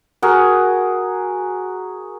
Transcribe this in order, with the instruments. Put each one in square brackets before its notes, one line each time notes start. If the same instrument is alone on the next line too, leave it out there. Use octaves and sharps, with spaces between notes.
[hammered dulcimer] F#4 G#4 A#4